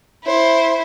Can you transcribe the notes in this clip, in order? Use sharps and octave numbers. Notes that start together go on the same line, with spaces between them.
E4 C5